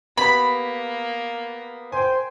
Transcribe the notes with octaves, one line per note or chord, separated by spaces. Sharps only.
A#3 B3 G4 B5
C5 G5 G#5